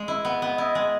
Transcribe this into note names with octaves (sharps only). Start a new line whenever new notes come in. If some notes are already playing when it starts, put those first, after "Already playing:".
Already playing: G#3
E4 D#5
B3
B3
E4 D#5
G#3